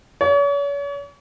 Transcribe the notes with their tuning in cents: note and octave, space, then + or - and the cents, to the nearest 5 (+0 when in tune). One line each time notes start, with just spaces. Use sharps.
C#5 +40